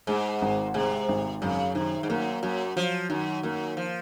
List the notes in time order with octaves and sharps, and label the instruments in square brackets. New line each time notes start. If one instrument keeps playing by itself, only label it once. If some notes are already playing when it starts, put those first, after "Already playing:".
[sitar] G#2 [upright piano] G#3
[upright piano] G#1
[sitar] C3 [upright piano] G#3
[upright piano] G#1
[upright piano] F#2 [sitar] C#3
[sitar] C3 [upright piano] D#3
[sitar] G#2
[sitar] F#2 [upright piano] A#3
[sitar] F#2 [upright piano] F#3
[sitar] F3 [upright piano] F#3
[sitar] F#2 [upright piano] D#3
[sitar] F#2 [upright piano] A#3
[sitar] F3